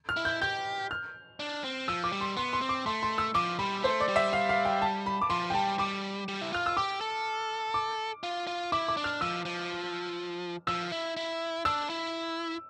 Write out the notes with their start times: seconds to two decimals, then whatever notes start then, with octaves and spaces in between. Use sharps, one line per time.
0.09 F6
0.17 E4
0.25 G6
0.41 G4 G6
0.91 F6
1.40 D4
1.64 C4
1.88 F3 E6
2.04 D6
2.12 G3
2.21 C6
2.37 B3 C6
2.53 C6
2.61 C4
2.69 D6
2.86 A3 C6
3.03 C6
3.18 E6
3.35 F3 D6
3.59 G3 B5
3.83 A3 C5
4.00 D5
4.09 G3
4.16 E5
4.33 F5
4.49 F5
4.65 G5
4.82 A5
5.06 B5
5.22 D6
5.30 F3 C6
5.50 G5
5.54 G3 A5
5.79 G3 D6
6.28 G3
6.42 E4
6.53 F4 F6
6.66 E6
6.77 G4 D6
7.01 A4
7.74 D6
8.23 F4
8.47 F4
8.72 E4 D6
8.88 D6
8.97 D4
9.04 F6
9.21 F3 E6
9.45 F3
10.67 F3 E6
10.92 E4
11.17 E4
11.65 D4 E6
11.90 E4